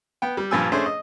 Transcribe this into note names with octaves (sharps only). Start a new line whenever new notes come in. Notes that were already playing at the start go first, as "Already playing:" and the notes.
B3 G5
G3
G2 A#2 F3 G#5 E6
A3 C#4 D4 G#4 C5
D#5